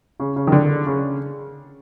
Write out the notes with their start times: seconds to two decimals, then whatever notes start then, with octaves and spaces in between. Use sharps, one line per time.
0.20 C#3
0.36 C#3
0.47 D#3
0.52 D3
0.86 C#3